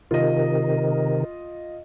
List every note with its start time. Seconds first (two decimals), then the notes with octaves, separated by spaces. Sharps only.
0.11 C3 D#3 F4 D#5